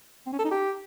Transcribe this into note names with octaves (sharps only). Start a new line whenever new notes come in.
C4
C#4
A4
D#4
G4